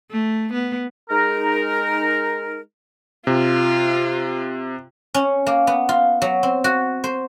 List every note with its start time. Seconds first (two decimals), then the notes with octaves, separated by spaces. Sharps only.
0.11 A3
0.52 B3
1.10 G#3 D#4 A#4
3.27 C3 F4
5.14 C#4
5.47 A#3
5.67 B3
5.89 F4
6.22 F#3
6.43 C4
6.64 F#4
7.04 C5